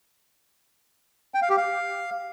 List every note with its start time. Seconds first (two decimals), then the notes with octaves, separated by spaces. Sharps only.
1.34 G5
1.42 F5
1.49 G4
1.57 F5